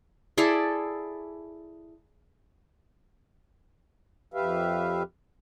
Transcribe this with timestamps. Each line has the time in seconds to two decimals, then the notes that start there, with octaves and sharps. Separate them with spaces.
0.37 E4 G#4 A4 D5
4.34 F2 G4 B4 E5 F5